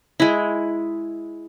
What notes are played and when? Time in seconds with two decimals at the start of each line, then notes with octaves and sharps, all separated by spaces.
0.20 G#3 E4